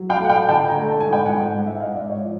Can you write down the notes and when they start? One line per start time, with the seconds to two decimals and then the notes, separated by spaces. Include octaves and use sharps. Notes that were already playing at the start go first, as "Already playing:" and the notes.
Already playing: F#3
0.10 F5 G5
0.20 A3 F#5
0.29 F5 G5
0.49 D3 G5 A5
0.68 G#5 A#5
0.78 A3
0.88 A5
1.00 G#5
1.07 G#2
1.13 G5
1.25 F#5 G#5
1.36 G#2
1.66 G#2 E5 F#5
1.80 D#5 F5
1.95 G#2 D5 E5
2.10 C#5 D#5
2.24 F3